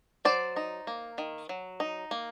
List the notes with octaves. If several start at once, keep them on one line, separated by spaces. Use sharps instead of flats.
F#3 C5 D5
D#4
A#3
D#3
F#3
D#4
A#3